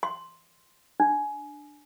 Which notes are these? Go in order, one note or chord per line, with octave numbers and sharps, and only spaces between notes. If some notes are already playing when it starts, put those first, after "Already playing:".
C6
D4